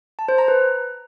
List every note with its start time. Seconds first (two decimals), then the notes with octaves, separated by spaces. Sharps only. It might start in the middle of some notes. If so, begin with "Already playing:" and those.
0.19 A5
0.28 C5
0.38 A#5
0.48 B4